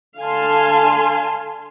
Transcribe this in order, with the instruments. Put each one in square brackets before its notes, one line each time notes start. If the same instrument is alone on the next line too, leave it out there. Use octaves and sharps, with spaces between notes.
[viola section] D3 F5 G#5 A5 C6